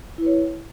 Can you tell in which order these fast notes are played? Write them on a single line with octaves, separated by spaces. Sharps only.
E4 B4 C#5